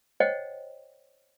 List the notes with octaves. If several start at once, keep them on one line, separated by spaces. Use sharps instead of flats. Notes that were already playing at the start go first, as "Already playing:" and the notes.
C5 C#5 D#5 F#5 G5